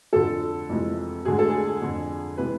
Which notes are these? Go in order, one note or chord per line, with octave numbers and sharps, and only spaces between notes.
F2 D3 F3 A4
F2 C3 E3 G#3
D2 D3 G#3 G#4
A4
G#4
F2 D3 F3
C3 E3 G#3 B4